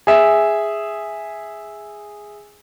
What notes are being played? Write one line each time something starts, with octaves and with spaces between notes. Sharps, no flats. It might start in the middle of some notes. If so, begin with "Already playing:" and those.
G#4 E5